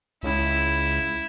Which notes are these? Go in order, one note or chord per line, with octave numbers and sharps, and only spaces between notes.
C#2 E4